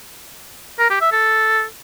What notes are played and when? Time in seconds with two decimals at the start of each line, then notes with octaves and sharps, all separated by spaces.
0.79 A#4
0.90 G4
1.01 E5
1.12 A4